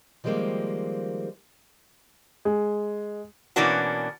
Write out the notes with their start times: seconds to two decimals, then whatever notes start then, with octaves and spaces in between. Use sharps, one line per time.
0.24 D#3 F3 G3 G#3 A#3 C4
2.45 G#3
3.56 B2 E3 A#3 C#4 D4 F#4